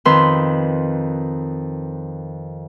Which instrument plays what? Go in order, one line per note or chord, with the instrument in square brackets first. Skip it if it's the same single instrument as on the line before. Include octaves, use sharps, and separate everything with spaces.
[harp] F2 D#3 B4 C6